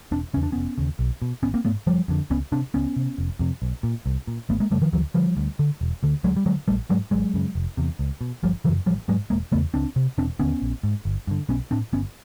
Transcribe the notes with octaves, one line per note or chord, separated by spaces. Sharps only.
E1 C4 D4
E2 C#3 C#4
D4
F1 B3 C#4
D#2 C#3
B1
B2
G#1 B3 C#4
A#3 C4
G#2 A3 B3
F#1 F3 G3
F2 D3
C#2 B3 C#4
C3 C4 D4
C#2 B3 C#4
C3
F1
F2 C3
B1
A#2
C2
A#2
G#1 A3 B3
G#3 A#3
F#2 C#3 G3 A3
D#3 F3
D2 E3 F#3
D3 F3 G3
D2
D3
E1
D2 D3
D2 F#3 G#3
G3
D3 F#3 G#3
A#1 G3 A3
G#2 F#3 G#3
G#1 F#3 G#3
F#2 C#3
F1
E2 C3
C#2
B2
G1 F3 G3
F#2 C#3 E3 F#3
A1 F3 G3
G#2 F#3 G#3
E1 G#3 A#3
E2 C#3 A3 B3
C#2 C4 D4
C3
E1 C4 D4
D#2 D3 B3 C#4
A#1
G#2
G1
G2 D3
B1 B3 C#4
A2 C4 D4
G1 B3 C#4